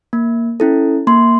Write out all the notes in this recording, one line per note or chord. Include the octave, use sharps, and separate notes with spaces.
A#3
C#4 E4 A4
A#3 C6